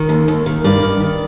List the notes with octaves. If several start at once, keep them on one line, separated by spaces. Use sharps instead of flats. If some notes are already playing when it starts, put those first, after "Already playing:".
Already playing: D#3
D#2
D#2
D#3
G2 D5
D#3
D#3